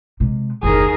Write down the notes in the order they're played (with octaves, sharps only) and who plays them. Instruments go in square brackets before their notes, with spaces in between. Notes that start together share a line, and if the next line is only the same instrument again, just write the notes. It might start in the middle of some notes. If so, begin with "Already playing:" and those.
[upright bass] C3 G#3
[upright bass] F#1 [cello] D#2 A#4 [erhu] G#4